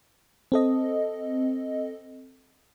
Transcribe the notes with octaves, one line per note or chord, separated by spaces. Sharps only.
C4 A4 D#5